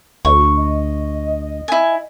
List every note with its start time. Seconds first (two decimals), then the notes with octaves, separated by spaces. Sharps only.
0.25 D2 C#6
0.58 D#5
1.68 E4 G#5